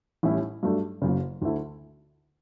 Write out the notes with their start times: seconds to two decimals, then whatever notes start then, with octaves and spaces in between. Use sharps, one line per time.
0.23 A1 A2 G3 C#4 E4
0.63 G2 F#3 A3 D4
1.02 F#1 F#2 C#3
1.42 D2 D3 A3 E4